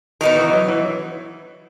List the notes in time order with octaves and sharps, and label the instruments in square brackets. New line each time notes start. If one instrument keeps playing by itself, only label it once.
[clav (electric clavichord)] D#3 [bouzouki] B3 D#4 F#4 A#4
[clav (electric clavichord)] E3
F#3
E3